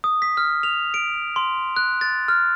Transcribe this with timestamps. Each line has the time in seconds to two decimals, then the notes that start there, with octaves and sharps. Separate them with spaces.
0.04 D#6
0.22 B6
0.37 F6
0.63 F7
0.94 D7
1.36 C6
1.77 F#6
2.01 A6
2.28 F6